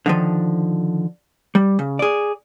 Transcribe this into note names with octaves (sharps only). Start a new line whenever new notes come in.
D3 D#3 F3
G3
C#3
G#4 D5